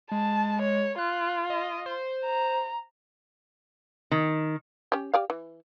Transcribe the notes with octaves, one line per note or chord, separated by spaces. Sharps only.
G#3 A5
C#5
F4 F#6
D#5
C5
A#5
D#3
C#4 G4
G4 D5 F5
E3